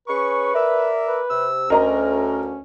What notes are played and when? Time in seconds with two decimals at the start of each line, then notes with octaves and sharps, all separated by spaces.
0.08 C#4 G#4 B4 C#6
0.54 A#4 D5 E5
1.07 B4
1.30 C3 E6
1.70 D2 C#4 A#4 D#5 A#5